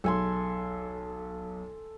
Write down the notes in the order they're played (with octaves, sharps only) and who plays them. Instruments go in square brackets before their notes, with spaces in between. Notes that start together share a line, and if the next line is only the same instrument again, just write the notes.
[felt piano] B1 [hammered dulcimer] A4 G#5 C6